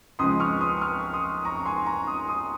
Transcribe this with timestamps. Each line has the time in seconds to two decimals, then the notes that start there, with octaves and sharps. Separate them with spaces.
0.19 C#2 C#3 F3 G#3 C6 D#6
0.40 C#6 F6
0.61 C6 D#6
0.81 C#6 F6
1.13 C6 D#6
1.45 A#5 C#6
1.56 C#6
1.65 G#5 C6
1.86 A#5 C#6
2.07 C6 D#6
2.28 C6 D#6